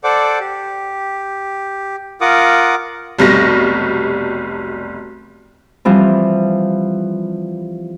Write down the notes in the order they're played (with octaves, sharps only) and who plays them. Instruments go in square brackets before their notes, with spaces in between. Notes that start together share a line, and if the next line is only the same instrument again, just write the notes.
[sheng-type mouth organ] A4 C5 D5 F#5 D6
G4
F4 A#4 F#5 D6 D#6
[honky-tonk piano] F1 B1 G3 A#6
[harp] E3 F3 G3 C4